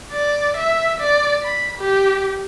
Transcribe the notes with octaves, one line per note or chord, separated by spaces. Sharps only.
D5
E5
D5
B5
G4